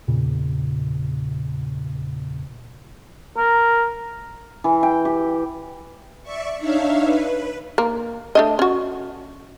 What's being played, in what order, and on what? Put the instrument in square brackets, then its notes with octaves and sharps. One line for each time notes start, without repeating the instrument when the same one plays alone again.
[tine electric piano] E2 A#2 C#3
[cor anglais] A#4
[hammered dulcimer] E3
G5
G4
[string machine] D5 E5 C#6
D4 D#4 C#5 E5 F5
B4
[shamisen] A#3
A3 D4 D#5
C#4 F#4